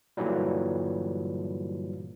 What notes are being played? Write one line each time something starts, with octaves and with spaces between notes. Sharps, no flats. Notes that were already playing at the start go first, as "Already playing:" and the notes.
G2 A#2 D3 E3 F#3 G3